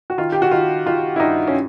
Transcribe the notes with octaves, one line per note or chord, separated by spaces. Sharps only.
F#4
D#3 F4
G4
F#4
D#3 F4
D#3 F4
E4
G2 D#4
C#4